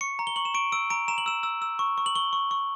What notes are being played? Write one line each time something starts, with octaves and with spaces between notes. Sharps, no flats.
C#6 C#7
A#5
G7
C#6 F#7
E7
C#6 D7
E6 D7
A#5 D7
A#5 E7
F#7
E6 E7
E6
E6
C#6
C#6
F#7
C#6 G7
C#6
C#6